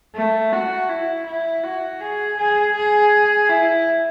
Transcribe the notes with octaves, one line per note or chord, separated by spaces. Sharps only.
A3
F#4
E4
E4
F#4
G#4
G#4
G#4
E4